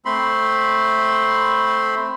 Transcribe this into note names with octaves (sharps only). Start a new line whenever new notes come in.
A3 C4 B5 C6